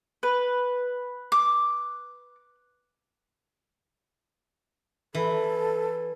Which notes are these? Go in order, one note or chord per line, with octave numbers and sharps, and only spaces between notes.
B4
D6
E3 A4